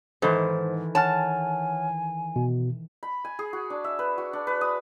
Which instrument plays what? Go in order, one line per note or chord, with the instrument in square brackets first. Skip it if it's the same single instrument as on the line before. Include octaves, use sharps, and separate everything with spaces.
[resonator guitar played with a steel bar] G#2 [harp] D#3 E3 A4 [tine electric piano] C5
[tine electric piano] C#5 F#5 F6 [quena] G#5 [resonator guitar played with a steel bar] A5
[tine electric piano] B2
[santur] B5
G#5
G#4
F#4
D4
E5
B4
F#4
D4
B4
D#6